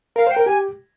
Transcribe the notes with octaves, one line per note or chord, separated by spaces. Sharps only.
A#4 F5
C5
G5
A#4
G4 G#5